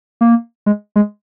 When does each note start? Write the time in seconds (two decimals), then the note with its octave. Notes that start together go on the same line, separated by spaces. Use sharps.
0.21 A#3
0.66 G#3
0.96 G#3